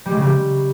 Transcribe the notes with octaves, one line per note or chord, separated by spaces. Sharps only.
G3
G#3
C#3
G3